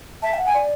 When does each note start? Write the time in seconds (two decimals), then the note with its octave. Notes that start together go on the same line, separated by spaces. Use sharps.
0.22 E5 A5
0.34 E5
0.38 F#5
0.47 G#5
0.54 D5